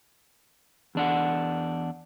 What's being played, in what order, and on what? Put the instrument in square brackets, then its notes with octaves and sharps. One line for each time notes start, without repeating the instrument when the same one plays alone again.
[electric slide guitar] E2 D4 F#5